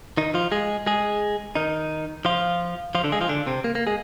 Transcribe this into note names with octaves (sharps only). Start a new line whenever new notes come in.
D#3 D#4
F3 F4
G#3 G#4
G#3 G#4
D#3 D#4
F3 F4
F3 F4
D3 D4
G#3 G#4
F3 F4
D3 D4
C3 C4
A#3
A#3
G#3 G#4